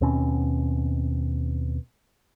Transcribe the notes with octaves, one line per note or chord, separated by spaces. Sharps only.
D#2 B2 C4 C#4